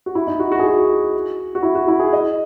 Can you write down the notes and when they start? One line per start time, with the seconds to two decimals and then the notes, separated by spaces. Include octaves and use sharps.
0.06 F#4
0.15 E4
0.27 D#4
0.40 F#4
0.52 F#4
0.59 G#4
0.67 F#4
1.55 F#4
1.63 E4
1.75 F#4
1.88 E4
1.99 G#4
2.13 D#5